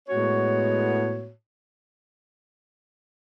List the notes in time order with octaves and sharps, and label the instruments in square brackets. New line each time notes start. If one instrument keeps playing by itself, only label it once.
[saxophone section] A2 G#3 B3 F#4 C#5